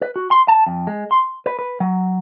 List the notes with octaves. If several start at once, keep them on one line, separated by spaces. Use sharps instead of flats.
B4
F#4
C6
A5
F2
G#3
C6
B4
B4
F#3